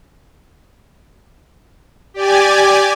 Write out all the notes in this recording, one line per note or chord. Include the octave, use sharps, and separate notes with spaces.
G4 D5 G#5